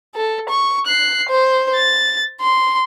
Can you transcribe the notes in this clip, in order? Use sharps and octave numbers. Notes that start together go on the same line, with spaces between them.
A4
C#6
F#6 C7
C5
A6
C6